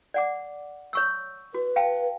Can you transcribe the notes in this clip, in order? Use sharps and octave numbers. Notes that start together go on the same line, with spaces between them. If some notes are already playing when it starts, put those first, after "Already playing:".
D5 F#5 D6
C#5 C#6 E6
F#4 B4
F5 G5 A5